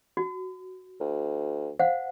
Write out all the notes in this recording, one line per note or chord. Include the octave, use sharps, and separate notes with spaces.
F#4
D2
C5 F5 F#5